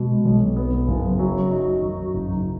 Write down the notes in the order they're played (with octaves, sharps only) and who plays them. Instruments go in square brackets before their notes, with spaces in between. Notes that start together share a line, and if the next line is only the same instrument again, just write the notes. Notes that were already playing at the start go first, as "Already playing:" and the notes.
Already playing: [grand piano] B2 [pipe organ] G#3
[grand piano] B1
B3
[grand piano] F#1 [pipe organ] C#4
[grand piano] F#3
[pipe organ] F#4
[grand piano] D#4
[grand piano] F#2 [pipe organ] F#4
[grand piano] F#1 [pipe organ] D#4